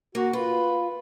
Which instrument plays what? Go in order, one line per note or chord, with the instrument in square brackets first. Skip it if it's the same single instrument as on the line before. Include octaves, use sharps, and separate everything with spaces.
[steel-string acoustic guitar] A#3 [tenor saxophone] F#4
[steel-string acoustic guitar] F4 [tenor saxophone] B4